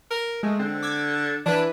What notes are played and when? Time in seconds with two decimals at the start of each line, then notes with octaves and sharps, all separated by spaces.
0.10 A#4
0.43 G#3 A3
0.59 D3 C4
0.83 D6 E6 G#6
1.46 E3 D4 E4 B4